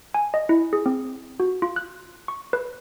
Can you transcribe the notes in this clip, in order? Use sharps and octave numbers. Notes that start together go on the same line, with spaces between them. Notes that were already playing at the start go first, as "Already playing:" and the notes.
G#5
D#5
E4
G#4
C4
F#4
F4
F#6
C#6
B4